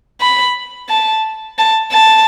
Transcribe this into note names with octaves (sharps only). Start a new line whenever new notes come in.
B5
A5
A5
A5